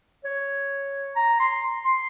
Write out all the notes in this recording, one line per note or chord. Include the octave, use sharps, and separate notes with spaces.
C#5
A#5
C6
C6